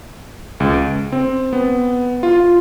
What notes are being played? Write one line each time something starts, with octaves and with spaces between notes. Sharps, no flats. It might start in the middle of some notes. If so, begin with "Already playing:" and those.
C#2
D7
C4
B3
F4
F4